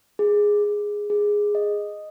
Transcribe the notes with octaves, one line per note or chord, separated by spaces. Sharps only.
G#4
G#4
G#4
D#5